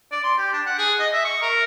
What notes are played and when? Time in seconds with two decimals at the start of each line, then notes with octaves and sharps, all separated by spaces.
0.12 D5
0.24 C6
0.38 G4
0.53 D4
0.66 F#5
0.79 G#4
0.99 D#5
1.13 E5
1.25 C#6
1.42 A#4